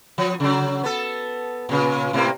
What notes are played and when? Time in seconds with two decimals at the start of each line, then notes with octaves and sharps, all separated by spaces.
0.18 F3
0.40 C#3 F#3
0.83 B3 A4
1.69 A#2 C#3
2.13 A2 C3 A#3